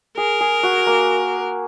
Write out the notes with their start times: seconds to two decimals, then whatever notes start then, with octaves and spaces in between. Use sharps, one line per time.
0.17 G#4 A#4
0.41 G#4
0.63 F#4
0.87 A#3